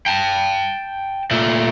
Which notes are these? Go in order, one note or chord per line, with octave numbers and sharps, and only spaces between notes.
G5 A5
A#2 A3